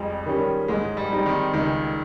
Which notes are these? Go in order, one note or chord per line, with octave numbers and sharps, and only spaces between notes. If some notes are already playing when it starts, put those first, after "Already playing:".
Already playing: F2 F3 G3 G#3
D#3 G3 C#4
G#2 G#3
G3
G3 C4 D#4
D#3
C#2 D#3